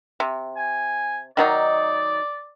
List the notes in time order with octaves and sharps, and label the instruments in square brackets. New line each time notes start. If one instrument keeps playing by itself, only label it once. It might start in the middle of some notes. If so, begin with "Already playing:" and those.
[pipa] C3
[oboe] G#5
[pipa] D#3 F#3 D#4 [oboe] D5